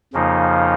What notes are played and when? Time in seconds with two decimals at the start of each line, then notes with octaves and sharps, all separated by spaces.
0.13 F2 C#3 F3 A#3 D#4